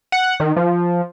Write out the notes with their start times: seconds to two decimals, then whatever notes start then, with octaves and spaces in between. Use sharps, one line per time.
0.12 F#5
0.40 D#3
0.56 F3